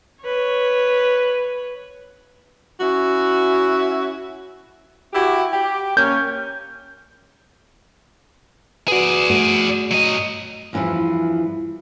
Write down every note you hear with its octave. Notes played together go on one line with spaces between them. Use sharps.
B4 C#5
C#4 E4 F#4
E4 F#4 G4
G4
A#3 C#4 G6
F#4 G#4 B4 D5
G2 A3 F#4
F#3 D#5
E2 G2 C3 E3 F3